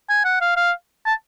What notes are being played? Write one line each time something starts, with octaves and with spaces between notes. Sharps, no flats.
G#5
F#5
F5
F5
A5